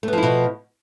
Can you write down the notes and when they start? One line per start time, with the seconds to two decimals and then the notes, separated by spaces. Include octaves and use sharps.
0.03 A3
0.08 B3
0.13 F3
0.18 E4
0.23 B2